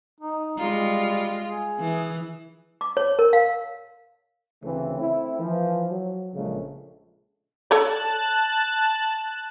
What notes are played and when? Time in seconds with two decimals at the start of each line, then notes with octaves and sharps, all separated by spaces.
0.20 D#4
0.58 G3 G#3 F4
1.45 G#4
1.79 E3
2.81 D6
2.97 C#5
3.19 A#4
3.33 F5
4.63 D2 C#3 E3 A3 C4
4.99 A3 C4 E4
5.39 E3 F3
5.90 F#3
6.34 A#1 C#3 G#3 A3
7.71 A4 C#5 D5 A5 F#6